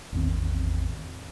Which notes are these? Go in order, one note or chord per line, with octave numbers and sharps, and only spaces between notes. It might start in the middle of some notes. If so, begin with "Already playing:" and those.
A1 E2 D#3 C4